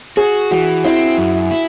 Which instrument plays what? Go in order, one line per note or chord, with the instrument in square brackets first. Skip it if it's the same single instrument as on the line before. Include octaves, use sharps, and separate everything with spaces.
[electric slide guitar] F#4 [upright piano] G#4
[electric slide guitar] E3 [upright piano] F#4
[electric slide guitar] C4 [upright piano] E4
[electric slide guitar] F#2
E4